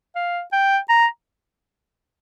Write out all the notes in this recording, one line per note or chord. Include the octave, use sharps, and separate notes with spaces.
F5
G5
A#5